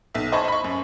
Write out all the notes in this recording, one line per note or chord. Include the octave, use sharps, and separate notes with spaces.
B1 E5
C5 D#5 G#5 A5 B5 C#6
B5 C#6
F#2